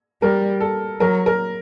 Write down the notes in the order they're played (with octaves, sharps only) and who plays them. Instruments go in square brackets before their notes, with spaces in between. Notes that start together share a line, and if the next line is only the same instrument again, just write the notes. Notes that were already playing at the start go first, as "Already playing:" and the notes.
[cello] G3 [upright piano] A#4
[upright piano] A4
[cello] F#3 [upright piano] A#4
[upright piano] A#4